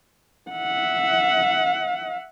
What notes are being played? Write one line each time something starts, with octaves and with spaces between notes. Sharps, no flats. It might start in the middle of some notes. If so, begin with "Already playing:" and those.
E5 F#5